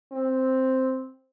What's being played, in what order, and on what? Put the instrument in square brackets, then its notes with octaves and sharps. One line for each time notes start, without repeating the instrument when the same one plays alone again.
[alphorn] C4